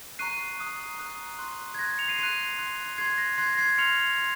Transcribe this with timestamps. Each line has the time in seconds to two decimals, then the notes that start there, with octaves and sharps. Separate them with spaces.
0.19 A#5 C#6 F#6 C7 D#7
0.59 A#5 D#6 F#6
0.99 A#5 D#6 F#6
1.39 C6 F#6
1.74 G#6
1.79 C6 F#6 A#6
1.98 C#7 F7
2.08 C7 D#7
2.18 C6 F#6 C7 D#7
2.58 C6 F#6
2.98 C6 F#6 G#6 C7
3.18 A#6
3.38 C6 F#6 G#6 C7
3.55 A#6
3.58 G#6 C7
3.78 C6 F6 C#7 F7
4.18 C6